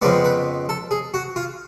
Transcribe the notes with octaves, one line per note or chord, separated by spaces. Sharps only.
F2 C#3 G#3 B3 D5
B4
A4
G#4
F#4
F4